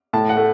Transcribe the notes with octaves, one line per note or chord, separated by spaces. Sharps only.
A2 A5
F#5
A3